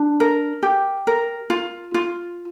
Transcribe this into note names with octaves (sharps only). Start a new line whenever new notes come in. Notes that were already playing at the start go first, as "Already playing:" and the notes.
Already playing: D4
A#4
G4
A#4
F4
F4